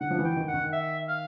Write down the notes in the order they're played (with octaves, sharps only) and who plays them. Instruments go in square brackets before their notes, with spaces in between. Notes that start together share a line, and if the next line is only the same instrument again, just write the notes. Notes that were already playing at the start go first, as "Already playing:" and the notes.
[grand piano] D3 [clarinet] F#5
[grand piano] F3
E3
[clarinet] G5
[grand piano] D#3
[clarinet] F#5
[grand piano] D#3
[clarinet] E5
F5